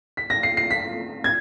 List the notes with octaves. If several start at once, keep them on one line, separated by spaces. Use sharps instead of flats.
B6
A#6
C7
C7
B6
G#6